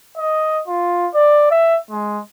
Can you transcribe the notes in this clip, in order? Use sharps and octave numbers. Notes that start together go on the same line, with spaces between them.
D#5
F4
D5
E5
G#3